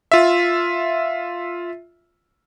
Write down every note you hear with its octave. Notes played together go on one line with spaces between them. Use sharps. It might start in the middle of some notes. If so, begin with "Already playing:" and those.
F4 E5